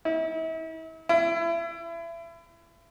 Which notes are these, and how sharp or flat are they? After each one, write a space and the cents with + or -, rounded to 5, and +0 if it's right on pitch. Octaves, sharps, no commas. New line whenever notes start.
E4 -40
E4 +30